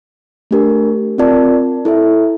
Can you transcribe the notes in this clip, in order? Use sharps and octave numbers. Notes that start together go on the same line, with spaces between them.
A3 D4 G4 A#4
C4 F4 A#4 D5 A5
E4 A4 E5